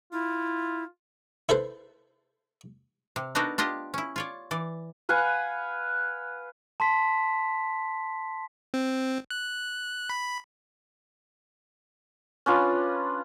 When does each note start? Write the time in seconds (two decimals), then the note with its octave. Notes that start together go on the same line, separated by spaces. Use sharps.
0.12 E4 F4
1.49 E4 A4 B4 C5
3.16 C3
3.35 B3 D4 D#4 F#4 A4 A#4
3.58 D4 F4 G4 D#5
3.94 C#4 E4
4.16 F4 C#5 D5
4.51 E3 D5
5.09 B4 F5 F#5 G#5
6.80 A5 C6 B6
8.74 C4
9.30 F#6
10.10 B5
12.46 C#4 D4 F4 B4